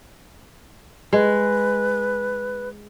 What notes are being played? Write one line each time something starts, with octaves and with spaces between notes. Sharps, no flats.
G#3 B4